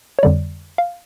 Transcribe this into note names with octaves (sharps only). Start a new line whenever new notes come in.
C#5
F2 D3 G3 D5
F5